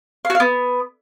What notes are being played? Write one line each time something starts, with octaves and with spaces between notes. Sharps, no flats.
F5
F#4
F5
B3